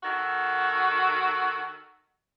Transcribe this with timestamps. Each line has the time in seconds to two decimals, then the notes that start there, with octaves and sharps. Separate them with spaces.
0.03 D#3 F#4 A4